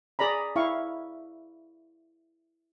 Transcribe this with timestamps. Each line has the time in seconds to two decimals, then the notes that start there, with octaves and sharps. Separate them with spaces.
0.19 G#4 D5 A#5 B5
0.56 E4 F5 C#6